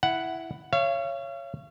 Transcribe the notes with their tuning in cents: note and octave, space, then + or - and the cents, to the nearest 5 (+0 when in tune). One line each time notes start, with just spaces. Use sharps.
E4 +0 F#5 +0
C#5 +0 F5 -40